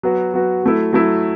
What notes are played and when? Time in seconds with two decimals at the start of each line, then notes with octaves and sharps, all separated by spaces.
0.03 F#3 B3 F#4
0.34 F#3 B3 F#4
0.63 F#3 A3 E4
0.93 F#3 A3 E4